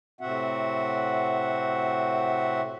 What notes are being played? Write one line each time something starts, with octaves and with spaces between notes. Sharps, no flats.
A2 C3 C4 F#4 E5 F#5